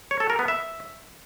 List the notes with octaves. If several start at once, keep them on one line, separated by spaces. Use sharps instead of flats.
C#5
A4
A#4
B3
E5